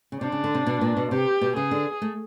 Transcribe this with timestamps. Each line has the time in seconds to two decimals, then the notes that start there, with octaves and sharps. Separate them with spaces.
0.12 C#3
0.21 C3 D4
0.32 C#3
0.44 D3
0.55 C3
0.66 B2
0.81 A#2
0.97 B2
1.11 C3 G4
1.41 B2
1.56 C#3 G#4
1.71 D3
2.02 A3